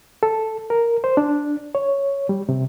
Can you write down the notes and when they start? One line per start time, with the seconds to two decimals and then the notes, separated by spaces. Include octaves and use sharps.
0.23 A4
0.70 A#4
1.04 C5
1.17 D4
1.75 C#5
2.29 G3
2.49 C3